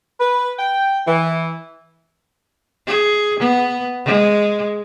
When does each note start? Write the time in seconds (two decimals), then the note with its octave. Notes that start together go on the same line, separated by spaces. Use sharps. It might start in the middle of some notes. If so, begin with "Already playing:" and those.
0.20 B4
0.58 G5
1.07 E3
2.87 G#4
3.39 B3
4.05 G#3